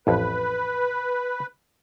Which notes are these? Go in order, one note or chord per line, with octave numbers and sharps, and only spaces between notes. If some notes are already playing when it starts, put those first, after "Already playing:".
A1 F2 B4